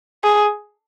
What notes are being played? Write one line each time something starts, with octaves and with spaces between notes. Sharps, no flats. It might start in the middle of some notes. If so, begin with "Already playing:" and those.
G#4